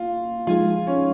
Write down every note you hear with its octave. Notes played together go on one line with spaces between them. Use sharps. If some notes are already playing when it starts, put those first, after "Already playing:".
Already playing: A#3 F4
F3 G#3 D#4 F4 G#4
C#4